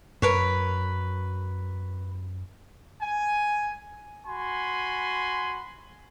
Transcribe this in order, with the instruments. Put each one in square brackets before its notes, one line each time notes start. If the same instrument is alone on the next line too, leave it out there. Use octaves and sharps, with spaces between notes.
[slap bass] F#2 [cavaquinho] A#4 B4 C#5
[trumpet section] G#5
F#4 G#5 B5 C6